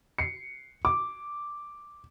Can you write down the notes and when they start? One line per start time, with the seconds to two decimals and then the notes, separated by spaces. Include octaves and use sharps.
0.18 C7 C#7
0.85 D6